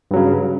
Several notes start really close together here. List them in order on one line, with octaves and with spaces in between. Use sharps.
G2 F#3 C#3